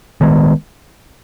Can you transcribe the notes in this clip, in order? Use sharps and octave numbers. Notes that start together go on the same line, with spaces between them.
D#3 G#3 B3